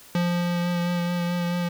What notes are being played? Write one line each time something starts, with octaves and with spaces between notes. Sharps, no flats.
F3